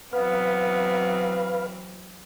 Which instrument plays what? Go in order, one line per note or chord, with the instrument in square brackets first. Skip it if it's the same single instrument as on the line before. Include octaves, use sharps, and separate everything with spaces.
[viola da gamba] E3 F#3 C4 [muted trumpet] B3 [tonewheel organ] B4 F5